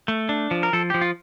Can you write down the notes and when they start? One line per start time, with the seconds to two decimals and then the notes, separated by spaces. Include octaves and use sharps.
0.08 A3
0.29 D4
0.51 F3
0.63 A#4
0.73 F3 A4
0.90 F3 G4
1.01 F4